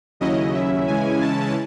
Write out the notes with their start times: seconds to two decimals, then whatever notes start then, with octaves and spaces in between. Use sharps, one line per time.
0.20 D#2 C#3 F#3 C#4 E4 D#5
0.55 E5
0.88 C#3 E3 G#3 C#4 E4 G#5
1.22 A5